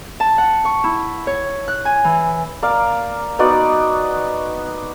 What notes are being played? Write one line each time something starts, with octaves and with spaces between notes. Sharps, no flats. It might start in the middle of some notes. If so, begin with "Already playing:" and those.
A5
F#5
C#6
E4
C#5
F#6
G#5
E3
A#3 D5 F5
B3 D#4 F#4 D5